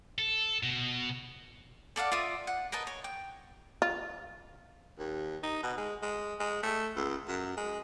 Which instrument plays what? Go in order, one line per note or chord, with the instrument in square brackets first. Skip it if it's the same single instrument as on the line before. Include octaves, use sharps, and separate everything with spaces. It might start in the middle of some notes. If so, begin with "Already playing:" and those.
[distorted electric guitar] A4
B2
[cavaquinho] A4 D5 F5 F#5
F4 D5 E5 D#6
F#5
A#4 B4 D#5 A5
C#5
G5
[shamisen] F4
[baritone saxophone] D#2
D#4
B2
G#3
G#3
G#3
A3
C#2
F#2
G#3